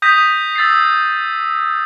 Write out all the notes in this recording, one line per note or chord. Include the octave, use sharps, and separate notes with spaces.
D#6 G6 A#6 B6 D#7
E6 A6 B6 C7